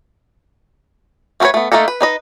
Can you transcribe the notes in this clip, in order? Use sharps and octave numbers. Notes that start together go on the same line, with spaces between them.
A3 F#4 A4 B4 C#5
A3 B3
A3 A#3 D#4 A4
B4
D#4 B4 D#5